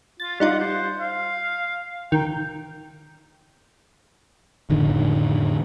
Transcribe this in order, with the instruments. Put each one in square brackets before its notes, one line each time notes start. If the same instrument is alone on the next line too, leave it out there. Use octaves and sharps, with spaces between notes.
[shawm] F4 [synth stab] A6
[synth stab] G3 D#4 F4 [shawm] F#5
[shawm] C5
F5
[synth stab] D#3 [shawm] G5
[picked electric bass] F1 A2 D3 D#3